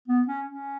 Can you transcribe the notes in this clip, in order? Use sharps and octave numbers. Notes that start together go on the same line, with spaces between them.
B3
C#4
C#4